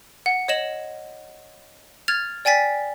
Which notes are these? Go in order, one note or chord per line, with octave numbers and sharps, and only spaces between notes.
F#5
C#5 D#5 E7 F#7
F6 G#6 A6 F7
D5 G5 G#5 A6 B6